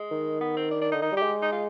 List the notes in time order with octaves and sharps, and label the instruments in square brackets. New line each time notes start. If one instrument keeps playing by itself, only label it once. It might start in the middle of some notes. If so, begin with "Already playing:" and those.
Already playing: [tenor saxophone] G#3
[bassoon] D#3
[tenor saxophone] B3
C4
D4
D4
[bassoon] D3 [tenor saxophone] D#4
[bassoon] D#3 [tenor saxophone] D#4
[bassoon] G3
[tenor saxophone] G4
[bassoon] G#3
[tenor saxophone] D#4
F4